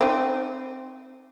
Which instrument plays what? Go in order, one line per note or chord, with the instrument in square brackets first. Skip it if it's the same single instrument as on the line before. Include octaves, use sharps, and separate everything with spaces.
[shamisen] C4 D#4